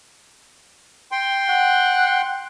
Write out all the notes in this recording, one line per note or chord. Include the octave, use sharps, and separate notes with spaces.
G5 C6
F#5